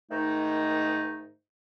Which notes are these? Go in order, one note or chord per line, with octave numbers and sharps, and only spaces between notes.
G#2 D#3 A3 D#4